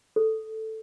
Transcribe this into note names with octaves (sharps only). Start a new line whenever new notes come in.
A4